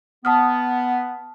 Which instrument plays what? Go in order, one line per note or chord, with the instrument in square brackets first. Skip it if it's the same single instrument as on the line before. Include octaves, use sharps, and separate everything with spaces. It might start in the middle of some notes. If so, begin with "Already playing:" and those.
[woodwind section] B3 [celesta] A5 D#6 F6